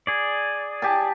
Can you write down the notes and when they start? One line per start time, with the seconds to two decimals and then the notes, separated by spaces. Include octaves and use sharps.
0.07 G#4 D5
0.82 G4 G#5 A5